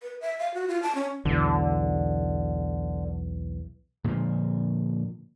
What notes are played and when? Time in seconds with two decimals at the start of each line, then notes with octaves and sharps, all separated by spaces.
0.03 B4
0.21 E5
0.39 F5
0.54 F#4
0.68 F4
0.82 A5
0.95 C#4
1.25 B1 E2 D3
4.04 A#2 D3 F3